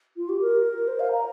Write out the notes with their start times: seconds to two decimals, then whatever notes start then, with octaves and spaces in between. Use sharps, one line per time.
0.17 F4
0.29 G4
0.41 A#4
0.88 C5
1.00 F5
1.12 A#5